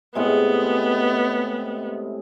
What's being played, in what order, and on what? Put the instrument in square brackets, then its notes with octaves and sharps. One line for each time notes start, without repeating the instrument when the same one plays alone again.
[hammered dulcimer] A2 C3 G#3 [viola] B3